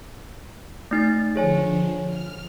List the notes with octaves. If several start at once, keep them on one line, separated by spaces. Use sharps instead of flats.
A3 D#4 A6
D3 F3 G#4 C#5 G#5
F6